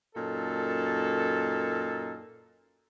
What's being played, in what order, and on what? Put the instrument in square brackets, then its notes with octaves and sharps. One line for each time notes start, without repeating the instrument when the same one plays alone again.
[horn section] F#2 A#2 D#4 A4